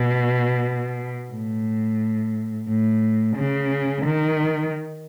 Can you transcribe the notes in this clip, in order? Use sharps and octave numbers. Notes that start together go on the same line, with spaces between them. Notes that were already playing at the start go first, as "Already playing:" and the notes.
Already playing: B2
A2
A2
C#3
D#3